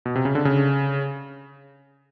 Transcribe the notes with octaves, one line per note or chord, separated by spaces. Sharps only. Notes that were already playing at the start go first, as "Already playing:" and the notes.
B2
C3
C#3
D3
C#3